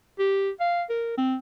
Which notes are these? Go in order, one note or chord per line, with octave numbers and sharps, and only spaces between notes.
G4
F5
A#4
C4